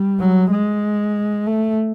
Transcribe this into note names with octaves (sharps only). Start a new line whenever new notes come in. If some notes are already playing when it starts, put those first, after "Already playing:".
Already playing: G3
F#3
G#3
A3